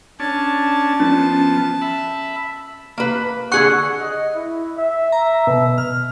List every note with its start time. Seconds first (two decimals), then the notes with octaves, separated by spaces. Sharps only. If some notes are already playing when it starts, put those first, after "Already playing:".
0.20 C#4 D4 A5
1.00 F3 B3 C#4
1.82 E5 B5
2.98 A#3 B4
3.52 D3 G#4 F#5 C#6 F#6 C#7
3.99 D#5
4.35 E4
4.78 E5
5.12 A#5
5.47 B2
5.78 F6